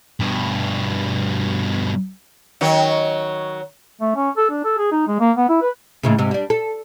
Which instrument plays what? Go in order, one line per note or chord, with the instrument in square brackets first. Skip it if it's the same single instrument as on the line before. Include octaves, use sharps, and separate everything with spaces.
[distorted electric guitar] G2 B2
[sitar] D#3 F#3 C#5
[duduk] A3
C#4
A4
D4
A4
G#4
D#4
G#3
A#3
B3
E4
B4
[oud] D#2 A2 C#3
G#2 C3
G3 D4
A4